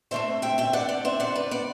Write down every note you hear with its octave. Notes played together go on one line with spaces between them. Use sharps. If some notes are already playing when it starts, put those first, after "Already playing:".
D3 A3 C4 C5 E5
E5 G5
E5 G5
D5 F#5
D5 F#5
C5 E5
D5 F#5
B4 D5
D5 F#5